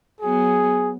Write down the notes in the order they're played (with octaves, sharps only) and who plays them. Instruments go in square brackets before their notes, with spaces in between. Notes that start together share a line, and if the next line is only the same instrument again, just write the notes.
[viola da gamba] F#3 B3 [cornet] G#4